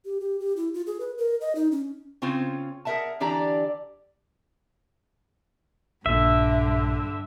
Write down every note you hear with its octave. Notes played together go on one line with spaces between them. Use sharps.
G4
G4
G4
E4
F4
G#4
B4
A#4
D#5
D#4
C#4
C#3 C4 C#4 F4 C5
G#4 A#4 C5 E5 F#5 A5
D3 E3 D4 G4 D5 A#5
A#1 G2 A#2 D3 E5